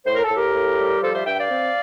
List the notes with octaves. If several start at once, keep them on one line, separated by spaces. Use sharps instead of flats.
A2 C5
A#4
A4
A2
G4 A#4
A2
G3
F3 A4 C5
C5 E5
G2 E5 G5
D5 F5
C4